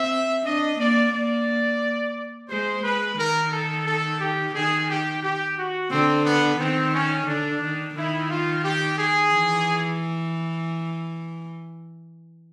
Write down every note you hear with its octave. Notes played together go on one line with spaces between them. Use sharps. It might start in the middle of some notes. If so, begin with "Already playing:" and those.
Already playing: C4 E5
D4 D#5
A#3 D5
A#3 D5
G#3 C5
G#3 B4
D#3 A#4
A4
A4
G4
D#3 G#4
G4
G4
F#4
D3 C4
B3
D#3 C4
C#4
D3 D4
D#3
D#3 E4
F4
G4
G#4
E3